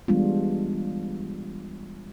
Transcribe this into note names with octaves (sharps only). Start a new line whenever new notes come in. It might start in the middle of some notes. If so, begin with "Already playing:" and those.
E3 G3 G#3 B3 D4 F4